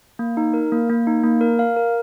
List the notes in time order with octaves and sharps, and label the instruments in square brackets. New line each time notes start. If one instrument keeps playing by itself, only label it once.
[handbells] A#3
D#4
A#4
A#3
A#3
D#4
A#3
A#4
F5
A#4